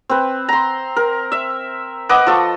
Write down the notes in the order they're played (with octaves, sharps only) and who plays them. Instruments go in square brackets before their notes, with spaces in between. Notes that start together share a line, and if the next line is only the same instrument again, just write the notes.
[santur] C4 B4
A#5 C6
A#4
E5
B4 D#5 F#5 D6
F3 A4 C#6